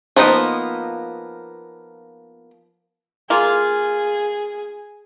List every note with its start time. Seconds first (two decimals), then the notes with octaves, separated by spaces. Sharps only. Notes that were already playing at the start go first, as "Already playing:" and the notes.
0.16 F3 A#3 B3 D#4
3.30 A#3 F4 G#4